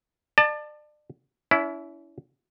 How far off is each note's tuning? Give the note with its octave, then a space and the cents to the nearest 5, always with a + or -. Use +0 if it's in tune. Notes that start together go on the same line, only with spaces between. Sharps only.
D5 +35 A5 +10
C#4 +40 E4 +0